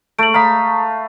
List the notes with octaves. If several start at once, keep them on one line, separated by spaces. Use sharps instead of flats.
A3 D7 F#7
F5 A#5 B5 D#6